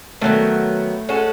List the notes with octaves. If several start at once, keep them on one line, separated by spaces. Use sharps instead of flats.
D#3 F#3 A3 B3
G#3 C#4 F#4 A4